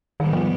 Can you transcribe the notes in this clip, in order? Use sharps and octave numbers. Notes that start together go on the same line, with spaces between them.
G#2 D#3 G3 B3
F3